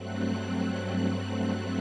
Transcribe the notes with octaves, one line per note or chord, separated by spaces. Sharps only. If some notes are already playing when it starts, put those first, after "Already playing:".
Already playing: G2 F#3 A3 C4 F#6